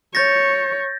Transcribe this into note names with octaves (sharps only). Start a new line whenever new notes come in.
C#5 G6 A6 A#6